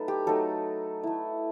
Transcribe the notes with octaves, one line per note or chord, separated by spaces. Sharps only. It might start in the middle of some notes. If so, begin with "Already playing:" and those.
Already playing: F#3 A3 D#4 A4 B4
G4
F#3 A3 D#4 A4
A3 E4